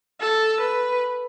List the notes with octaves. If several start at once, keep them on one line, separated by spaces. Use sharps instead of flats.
A4
B4